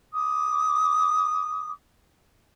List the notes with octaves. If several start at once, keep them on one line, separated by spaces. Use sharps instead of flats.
D6 D#6